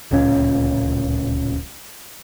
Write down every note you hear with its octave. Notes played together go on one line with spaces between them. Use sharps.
D1 C#2 A#2 C#4